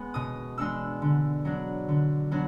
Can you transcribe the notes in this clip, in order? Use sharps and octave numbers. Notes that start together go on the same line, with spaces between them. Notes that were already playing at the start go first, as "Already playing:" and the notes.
Already playing: G#3 B3
B2 D#6
G#3 B3 D4 E6
D3
F#3 B3 D4
D3
F#3 B3 D4